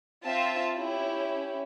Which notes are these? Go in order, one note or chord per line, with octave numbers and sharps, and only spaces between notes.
C4 F4 E5 A5
C#4 E4 G4